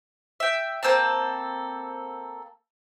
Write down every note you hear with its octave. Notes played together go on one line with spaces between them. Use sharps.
E5 G5
A#3 C4 A4 A5